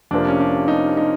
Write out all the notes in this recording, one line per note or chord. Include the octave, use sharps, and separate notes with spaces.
F1 F2 C3 F3 A#3 D4
C#4
D4
D#4
D#4